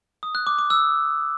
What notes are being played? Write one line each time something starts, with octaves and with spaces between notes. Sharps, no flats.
D#6
F#6
D6
D6
E6